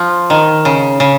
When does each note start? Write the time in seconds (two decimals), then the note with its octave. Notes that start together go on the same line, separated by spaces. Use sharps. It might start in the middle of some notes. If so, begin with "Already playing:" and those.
Already playing: F3
0.30 D#3
0.65 C#3
1.00 C#3